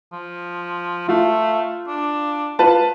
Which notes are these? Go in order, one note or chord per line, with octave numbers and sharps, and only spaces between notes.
F3
A3 F4
D4
F4 B4 A5